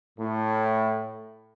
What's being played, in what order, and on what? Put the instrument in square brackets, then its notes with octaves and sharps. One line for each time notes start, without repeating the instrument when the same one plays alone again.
[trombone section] A2